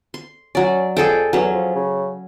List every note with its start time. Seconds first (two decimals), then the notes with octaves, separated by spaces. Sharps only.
0.14 C6
0.55 F#3 C#4 D5
0.97 F2 G#4 A4 G5
1.33 E2 F#3 C#4
1.54 F3
1.75 C#3